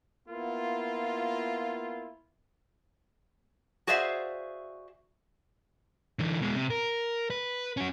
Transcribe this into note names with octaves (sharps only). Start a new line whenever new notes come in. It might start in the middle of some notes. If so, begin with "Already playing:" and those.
A#3 B3 E4 F4
F#4 G#4 C5 D5 E5 F5
D3 E3
B2 G#3
C3
A#4
B4
C#4 F#4